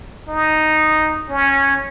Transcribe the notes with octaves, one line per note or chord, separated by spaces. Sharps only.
D#4
C#4